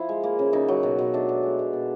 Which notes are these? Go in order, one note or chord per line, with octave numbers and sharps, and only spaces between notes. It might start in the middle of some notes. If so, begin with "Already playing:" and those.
Already playing: F3 E4
G#3
A#3
C#3
C#3 D#4
F#3
B2
B2
A3 D4
B2
G#3
B2
B2